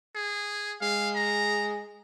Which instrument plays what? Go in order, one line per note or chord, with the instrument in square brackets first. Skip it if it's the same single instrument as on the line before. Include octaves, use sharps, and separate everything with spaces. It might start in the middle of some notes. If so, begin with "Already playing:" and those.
[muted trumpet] G#4
[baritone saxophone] G#3 [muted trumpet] F5
[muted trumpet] A#5